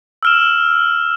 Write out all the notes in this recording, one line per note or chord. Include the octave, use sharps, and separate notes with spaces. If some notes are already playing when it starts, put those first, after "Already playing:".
E6 F6 E7